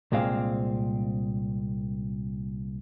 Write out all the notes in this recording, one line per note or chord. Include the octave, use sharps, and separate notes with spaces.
C2 A#2 G#3 C4 F5